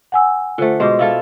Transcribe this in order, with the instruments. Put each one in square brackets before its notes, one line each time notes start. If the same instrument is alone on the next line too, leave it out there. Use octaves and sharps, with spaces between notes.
[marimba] F#5 G#5 E6
[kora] D3 A3 [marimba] F4 C5
[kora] B2 G#3 C5 [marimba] D#5 D6
[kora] E4 F4 A4